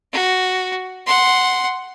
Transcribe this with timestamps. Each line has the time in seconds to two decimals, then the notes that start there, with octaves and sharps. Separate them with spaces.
0.13 F#4
1.06 F#5 C6